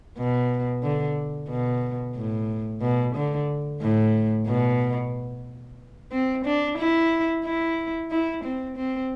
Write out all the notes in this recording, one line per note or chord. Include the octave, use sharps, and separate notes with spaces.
B2
D3
B2
A2
B2
D3
A2
B2
C4
D4
E4
E4
E4
C4
C4